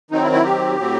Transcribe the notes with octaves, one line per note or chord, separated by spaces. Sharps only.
D#3 F#3 C4 D#4
E4
E4
G4
A2 F#3 C4